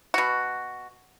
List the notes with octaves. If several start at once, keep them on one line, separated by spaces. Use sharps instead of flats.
B2 F#4